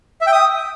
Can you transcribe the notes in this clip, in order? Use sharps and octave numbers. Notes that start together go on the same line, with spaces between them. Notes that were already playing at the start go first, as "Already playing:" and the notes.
E5
G5
D#6